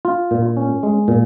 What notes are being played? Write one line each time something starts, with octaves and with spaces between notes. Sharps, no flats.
F4
A#2
C#4
G#3
A#2